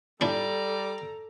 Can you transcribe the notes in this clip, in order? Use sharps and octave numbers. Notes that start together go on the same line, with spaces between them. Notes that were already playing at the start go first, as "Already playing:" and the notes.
G3 D4 E4 A4 D5 A#5